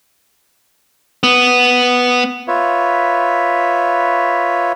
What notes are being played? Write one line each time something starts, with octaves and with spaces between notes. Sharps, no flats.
B3
F4 B4 C#5 E5